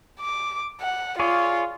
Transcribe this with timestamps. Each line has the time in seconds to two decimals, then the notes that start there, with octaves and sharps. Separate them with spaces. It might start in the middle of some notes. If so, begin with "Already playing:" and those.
0.21 D6
0.81 F#5
1.19 F4 G#4 C#5 D5